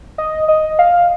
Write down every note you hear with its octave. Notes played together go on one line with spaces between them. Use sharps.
D#5
D#5
F5